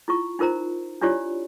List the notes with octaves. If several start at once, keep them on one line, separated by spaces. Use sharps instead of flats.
E4 F4 C#6
D#4 F4 A#4 C5 A#5
D4 E4 F4 G4 C#5 D5